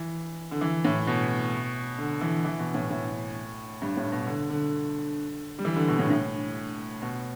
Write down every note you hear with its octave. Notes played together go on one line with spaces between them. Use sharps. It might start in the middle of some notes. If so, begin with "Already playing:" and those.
Already playing: E3
D3
E3
A2
B2
D3
E3
E3
B2
A2
A2
G2
A2
B2
D3
D3
G3
E3
D3
B2
A2
A2
B2